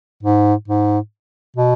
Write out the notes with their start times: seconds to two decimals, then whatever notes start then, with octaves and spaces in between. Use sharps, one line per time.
0.23 G#2
0.68 G#2
1.56 B2